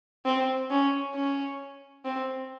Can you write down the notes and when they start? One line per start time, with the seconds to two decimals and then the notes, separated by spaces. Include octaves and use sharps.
0.25 C4
0.70 C#4
1.14 C#4
2.05 C4